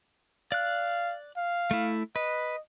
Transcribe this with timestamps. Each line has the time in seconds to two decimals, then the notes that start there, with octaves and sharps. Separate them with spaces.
0.52 D5 F5 F#6
1.37 F5
1.71 A3 E4
2.16 B4 D#5